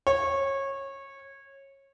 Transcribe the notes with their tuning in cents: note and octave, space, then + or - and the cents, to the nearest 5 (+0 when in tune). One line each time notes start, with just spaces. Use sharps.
C#5 -20